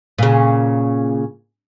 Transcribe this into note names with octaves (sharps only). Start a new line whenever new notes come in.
A#2 C#3